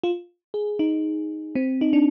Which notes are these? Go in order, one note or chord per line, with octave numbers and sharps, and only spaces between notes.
F4
G#4
D#4
C4
D#4
D4